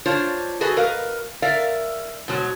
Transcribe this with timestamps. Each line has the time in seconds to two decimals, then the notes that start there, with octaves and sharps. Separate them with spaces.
0.06 D4 F4 C5 C#5
0.61 F#4 G#4 A4 B4 D#5
0.77 A#4 B4 D#5 F5
1.42 A#4 D5 E5 F5
2.28 G#2 B2 F#3